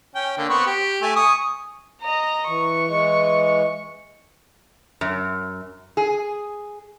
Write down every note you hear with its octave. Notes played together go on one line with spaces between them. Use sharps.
C#4 G5
D3 A#3
B3 C4 C#6
G4
A3 G#5
G#5 C#6 D#6
D#5 A#5
E3 C#6
E3 G#3
F#2
G#4